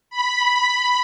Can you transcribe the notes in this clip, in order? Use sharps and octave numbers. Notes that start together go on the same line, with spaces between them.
B5